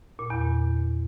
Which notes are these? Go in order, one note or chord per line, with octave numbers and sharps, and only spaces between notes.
A#2
E2
A#2